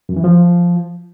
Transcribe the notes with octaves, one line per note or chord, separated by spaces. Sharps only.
F#2
E3
F3